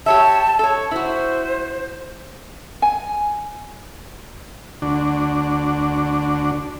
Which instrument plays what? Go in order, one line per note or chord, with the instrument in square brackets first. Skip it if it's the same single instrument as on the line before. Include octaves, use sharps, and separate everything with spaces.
[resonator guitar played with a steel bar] G4 C#5 E5 [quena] A5
[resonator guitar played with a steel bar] A4 C#5
[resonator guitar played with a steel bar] E4 F#4 [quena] C5
[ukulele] G#5
[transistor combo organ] D2 D3 D4 F#4